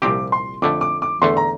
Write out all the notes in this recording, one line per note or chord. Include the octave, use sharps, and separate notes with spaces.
C2 A#2 F3 C4 G4 D6
C6
F2 D3 A3 D6
D6
D6
E2 D3 A3 C6
A#5